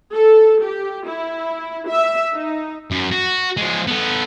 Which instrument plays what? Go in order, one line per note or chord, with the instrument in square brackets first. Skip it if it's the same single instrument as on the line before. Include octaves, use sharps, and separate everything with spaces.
[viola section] A4
G4
E4
E5
D#4
[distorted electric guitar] F#2
F#4
F3 G#3
B3 A4